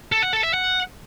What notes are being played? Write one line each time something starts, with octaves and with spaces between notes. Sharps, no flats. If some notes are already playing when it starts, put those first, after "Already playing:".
A4
F#5
A4
E5
F#5